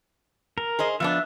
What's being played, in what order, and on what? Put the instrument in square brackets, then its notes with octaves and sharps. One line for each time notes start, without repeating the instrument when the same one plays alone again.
[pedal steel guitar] A#4
[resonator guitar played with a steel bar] G#4 C5 D#5
[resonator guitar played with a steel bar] F3 B3 D4 [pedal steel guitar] E5